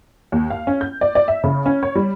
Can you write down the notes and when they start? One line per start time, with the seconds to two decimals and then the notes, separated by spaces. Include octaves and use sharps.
0.32 D#2
0.50 F5
0.67 C#4
0.81 G6
1.01 D5
1.15 D5
1.28 E5
1.44 C#3
1.66 C#4
1.83 C#5
1.95 G3